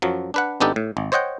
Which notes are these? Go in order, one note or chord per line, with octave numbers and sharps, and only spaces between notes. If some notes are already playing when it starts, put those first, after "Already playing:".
F#2 F3 F#3
D4 B4 F#5
G#1 B3 D4 D#4 G4 A4
A2
G#1
C5 C#5 D#5 F#5 G5